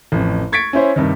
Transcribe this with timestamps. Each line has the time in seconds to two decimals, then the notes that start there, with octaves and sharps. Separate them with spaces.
0.12 A1 F2
0.52 C#6 G#6 A6 B6 C#7 D7
0.73 C#4 E4 C5 C#5
0.96 G2 C3 D#3